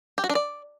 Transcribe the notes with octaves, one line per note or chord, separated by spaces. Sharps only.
G4
F#4
D4
D5